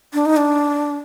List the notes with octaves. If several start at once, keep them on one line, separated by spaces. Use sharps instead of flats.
D4
D#4
D4